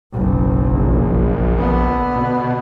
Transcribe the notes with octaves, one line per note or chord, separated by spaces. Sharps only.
F#1 B1
A#1
D3 B3
B2